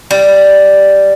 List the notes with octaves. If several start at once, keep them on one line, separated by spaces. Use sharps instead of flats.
G3